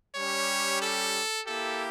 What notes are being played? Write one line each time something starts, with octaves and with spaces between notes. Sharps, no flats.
G3 C#4 G4 C#5
A4
A#3 E4 G4 A4